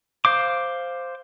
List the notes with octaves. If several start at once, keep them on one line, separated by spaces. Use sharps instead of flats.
C5 F5 D6